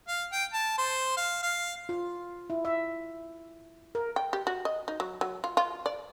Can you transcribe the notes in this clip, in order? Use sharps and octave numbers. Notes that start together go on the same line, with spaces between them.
F5
G5
A5
C5
F5
F5
F4
E4
E5
A#4
G5
G4
F#4
D#5
D#4
F#3
F#3
F4
F4
D5